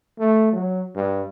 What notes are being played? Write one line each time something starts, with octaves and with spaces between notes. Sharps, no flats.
A3
F#3
G2